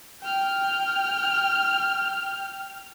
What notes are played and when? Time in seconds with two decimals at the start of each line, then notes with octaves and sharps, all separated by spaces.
0.22 G5 F6